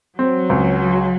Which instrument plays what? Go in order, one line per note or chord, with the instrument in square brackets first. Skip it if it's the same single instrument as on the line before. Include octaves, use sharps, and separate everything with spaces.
[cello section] F#3 [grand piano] C4
[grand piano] C#2